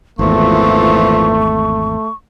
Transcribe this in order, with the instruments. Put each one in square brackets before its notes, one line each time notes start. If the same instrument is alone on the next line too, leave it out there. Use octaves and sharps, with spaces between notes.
[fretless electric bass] G#1 E2 [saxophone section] A#2 E3 F3 [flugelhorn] A3 [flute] C#6